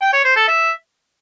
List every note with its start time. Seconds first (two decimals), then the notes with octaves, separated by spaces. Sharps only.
0.01 G5
0.13 C#5
0.25 C5
0.36 A4
0.48 E5